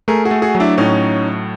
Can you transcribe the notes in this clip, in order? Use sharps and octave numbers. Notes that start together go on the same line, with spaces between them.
A3 G#4 A#4
F#4 G#4
A3
F#4 G#4
F#3
D4 E4
A2 C#4 D#4